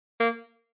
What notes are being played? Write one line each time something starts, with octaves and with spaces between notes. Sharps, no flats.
A#3